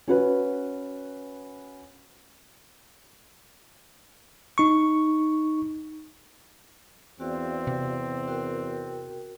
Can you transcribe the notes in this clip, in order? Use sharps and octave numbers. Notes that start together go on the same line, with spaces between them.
C#4 F#4 B4
D#4 C#6
E2 C4 F#4 D5 F5
C3
F#4 A#4 G5